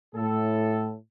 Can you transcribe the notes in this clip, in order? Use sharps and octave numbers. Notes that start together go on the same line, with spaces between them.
A2 A4